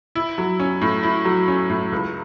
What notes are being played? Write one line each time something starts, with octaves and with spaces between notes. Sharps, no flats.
E4
F#3
C#4
A2
E4
F#3
C#4
A2
C#2